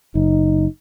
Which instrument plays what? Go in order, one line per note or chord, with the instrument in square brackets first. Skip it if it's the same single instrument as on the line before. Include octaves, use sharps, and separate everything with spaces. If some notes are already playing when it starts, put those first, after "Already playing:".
[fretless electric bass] F#1 [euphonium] D#4